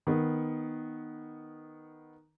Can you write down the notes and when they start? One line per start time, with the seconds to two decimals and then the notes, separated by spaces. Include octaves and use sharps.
0.07 D#3 B3